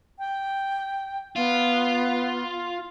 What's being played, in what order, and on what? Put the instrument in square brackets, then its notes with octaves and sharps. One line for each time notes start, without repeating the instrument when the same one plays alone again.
[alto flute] G5
[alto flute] B3 [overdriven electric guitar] F4